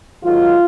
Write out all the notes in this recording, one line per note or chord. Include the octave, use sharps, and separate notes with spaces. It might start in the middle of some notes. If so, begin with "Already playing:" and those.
G#2 D#3 F#3 F4